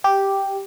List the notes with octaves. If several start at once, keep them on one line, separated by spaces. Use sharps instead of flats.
G4